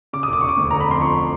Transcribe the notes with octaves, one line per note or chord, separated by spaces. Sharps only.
C#3 D6
D#6
E1 D6
E1 C#6
D6
D2
D3 A#5
B5
F2 C6
F3 C#6